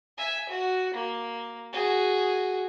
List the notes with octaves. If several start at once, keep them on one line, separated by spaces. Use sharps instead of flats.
E5 G#5
F#4
A#3
F#4 G#4